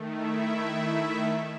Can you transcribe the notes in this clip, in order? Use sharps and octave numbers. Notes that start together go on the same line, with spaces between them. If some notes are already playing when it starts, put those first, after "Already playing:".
Already playing: D#3 A3
E4 E5